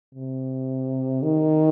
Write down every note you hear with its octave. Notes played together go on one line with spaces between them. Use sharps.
C3
D#3